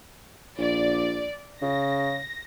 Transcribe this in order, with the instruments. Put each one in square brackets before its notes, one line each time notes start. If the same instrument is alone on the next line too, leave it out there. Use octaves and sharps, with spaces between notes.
[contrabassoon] A#1 [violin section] D5
[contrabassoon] C#3 [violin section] A#6